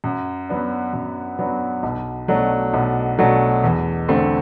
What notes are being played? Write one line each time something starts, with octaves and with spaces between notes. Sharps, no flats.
F#2
F#3 B3 D4
F#2
F#3 B3 D4
B1
B2 F#3 A3 D4
B1
B2 F#3 A3 D4
E2
D3 A3 C4